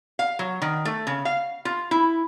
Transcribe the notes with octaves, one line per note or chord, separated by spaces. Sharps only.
F5
F#3
D#3
A3
C#3
F5
F4
E4